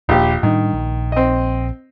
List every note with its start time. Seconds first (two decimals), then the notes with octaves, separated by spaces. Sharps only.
0.09 D#1 A#1 G4
0.43 A2 D#3 G3 D4
0.73 A#1
1.12 C4 D#5